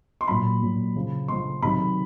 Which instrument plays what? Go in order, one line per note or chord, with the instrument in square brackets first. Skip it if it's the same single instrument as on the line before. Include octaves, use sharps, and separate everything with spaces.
[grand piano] C6
A#2 F#3 B5
A#2 F#3
C#3 F3
C#3 F3 C6
C3 D#3 F#3 B5